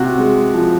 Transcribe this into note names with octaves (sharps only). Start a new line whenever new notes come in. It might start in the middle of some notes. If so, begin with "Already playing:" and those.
Already playing: C3 F#4
G#3
F3